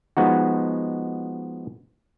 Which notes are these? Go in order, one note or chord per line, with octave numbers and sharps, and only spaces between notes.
F3 G#3 B3 D#4 F#4